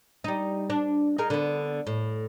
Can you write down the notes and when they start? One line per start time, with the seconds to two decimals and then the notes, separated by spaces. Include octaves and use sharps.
0.24 G3 D#4
0.70 D4
1.18 D#4 G#4 A#4
1.30 D3 B3
1.87 A2